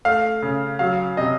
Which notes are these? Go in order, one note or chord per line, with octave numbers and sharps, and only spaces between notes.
A3 F5
C#3
F#3 F5
C3 D#5